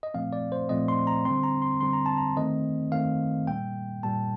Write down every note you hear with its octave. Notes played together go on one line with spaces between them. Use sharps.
D#5
A#2 F3 A3 C4 F5
D5
C5
A#2 F3 A3 C4 D#5
C6
A#5
D3 G3 C4 C6
A#5
C6
D3 G3 C4 C6
A#5
A5
A#5
D#3 A3 C4 D#5
D#3 A3 C4 F5
A#2 G3 A#3 G5
A#2 G3 A#3 A5